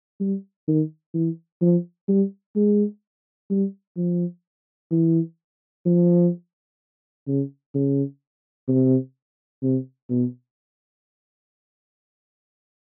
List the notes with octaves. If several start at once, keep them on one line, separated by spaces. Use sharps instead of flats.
G3
D#3
E3
F3
G3
G#3
G3
F3
E3
F3
C#3
C#3
C3
C3
B2